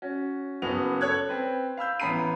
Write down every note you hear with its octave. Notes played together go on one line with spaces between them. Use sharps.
C#4 F#4
F#1 B3 F#4 F7
A4 C#5 F#6 G#6
C4 B4
F5 B5 E6 G6
A1 B3 A#5 B5 C7 D#7